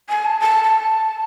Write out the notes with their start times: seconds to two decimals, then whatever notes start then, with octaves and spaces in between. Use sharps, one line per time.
0.09 G#5
0.25 A5
0.40 A5
0.64 A5